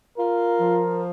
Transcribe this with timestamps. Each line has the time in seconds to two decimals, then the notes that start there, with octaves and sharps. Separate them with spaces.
0.17 F4 A#4
0.59 F3